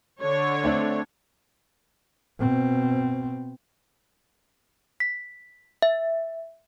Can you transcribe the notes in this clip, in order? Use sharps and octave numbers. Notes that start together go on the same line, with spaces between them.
D3 C#5
A3 C4 D4
B2 C4
B6
E5